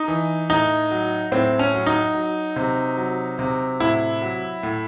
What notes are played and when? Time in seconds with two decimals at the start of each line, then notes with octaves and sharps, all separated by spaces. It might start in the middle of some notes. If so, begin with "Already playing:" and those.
Already playing: D#4
0.08 E3
0.50 A2 D#4
0.91 F#3
1.32 A2 C4
1.59 C#4
1.74 F#3
1.86 D#4
2.15 F#3
2.56 C3
2.97 F#3
3.39 C3
3.80 A2 E4
4.22 F#3
4.63 A2